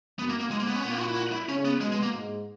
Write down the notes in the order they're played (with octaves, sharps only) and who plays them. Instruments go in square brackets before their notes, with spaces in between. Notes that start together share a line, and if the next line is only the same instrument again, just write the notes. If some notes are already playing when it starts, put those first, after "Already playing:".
[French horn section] F#2 [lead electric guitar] B3
[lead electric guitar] A#3
A#3
[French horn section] G#2 [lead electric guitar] G#3
[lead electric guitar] A#3
B3
C#4
[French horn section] A#2 [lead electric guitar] B3
[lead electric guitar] A#3
F#4
E4
F#4
E4
[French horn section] C#3 [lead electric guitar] C#4
[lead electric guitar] B3
[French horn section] B2 [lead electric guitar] G#3
[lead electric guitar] G#3
A#3
[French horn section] G#2